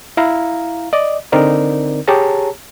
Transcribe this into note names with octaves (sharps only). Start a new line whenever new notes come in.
E4 F5 A#5
D5 D#5
D3 C4 D#4 A#4 D5
G4 G#4 C#5 A5 A#5